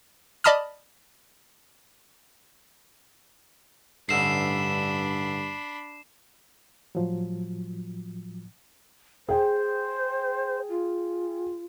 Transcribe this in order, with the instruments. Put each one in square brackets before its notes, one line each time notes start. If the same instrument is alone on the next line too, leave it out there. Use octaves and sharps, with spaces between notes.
[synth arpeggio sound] D5 D#5 A5 B5 D#6 F6
[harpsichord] A1 D3 D#4 [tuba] G2 [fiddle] D4 B5 [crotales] C7 E7
[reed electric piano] A2 F3 F#3
[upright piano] G#4 G5 [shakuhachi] C5
[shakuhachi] F4